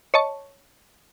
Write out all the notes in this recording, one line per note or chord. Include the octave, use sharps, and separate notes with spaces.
C#5 D#5 A5 C#6